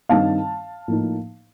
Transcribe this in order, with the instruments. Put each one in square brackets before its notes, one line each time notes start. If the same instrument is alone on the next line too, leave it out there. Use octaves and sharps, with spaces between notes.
[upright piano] G2 D#3 G3 C4 D#4 F5 A5
A2 F3 A#3 D#4